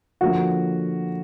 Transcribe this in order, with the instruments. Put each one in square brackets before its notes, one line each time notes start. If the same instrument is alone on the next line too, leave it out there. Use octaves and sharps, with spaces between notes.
[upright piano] D3 F3 A#3 F#4